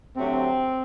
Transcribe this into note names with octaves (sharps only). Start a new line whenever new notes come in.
D2 C3 F#3 A3 C4